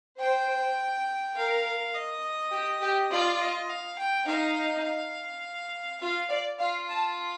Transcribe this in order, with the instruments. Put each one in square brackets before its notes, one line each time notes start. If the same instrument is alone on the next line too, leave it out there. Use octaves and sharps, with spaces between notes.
[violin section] C5 [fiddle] G5
[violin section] A#4 [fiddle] F5
[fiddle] D#5
[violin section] G4
G4
[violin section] F4 [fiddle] D5
[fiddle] D#5
F5
G5
[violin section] D#4 [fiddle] F5
[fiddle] F5
[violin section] F4 [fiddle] F5
[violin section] D5
[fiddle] F4 [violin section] F5
[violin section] A5